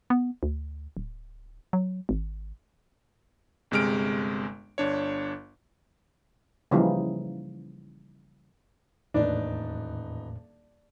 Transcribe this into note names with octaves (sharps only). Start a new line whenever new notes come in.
B3
D2
D1
F#3
G#1
G1 C3 G#3 F6 D7
G1 D4 C#5
C#3 E3 F3 G3 A#3 D#4
D#1 E2 A2 D4 D#4 B4